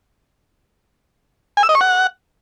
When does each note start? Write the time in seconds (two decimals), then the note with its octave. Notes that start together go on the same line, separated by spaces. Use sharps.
1.57 G#5
1.63 E6
1.69 D#5
1.75 C#6
1.81 F#5